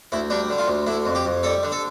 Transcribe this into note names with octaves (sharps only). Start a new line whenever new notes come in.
D2 E4
G3 D4
D3
F4
D2
D3 E4
F2
G4
F2
G3 A4
D3
A4